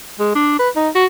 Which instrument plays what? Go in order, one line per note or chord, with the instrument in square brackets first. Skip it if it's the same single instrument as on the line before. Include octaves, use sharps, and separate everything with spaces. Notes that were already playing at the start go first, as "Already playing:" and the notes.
[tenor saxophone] G#3
D4
B4
D#4
F#4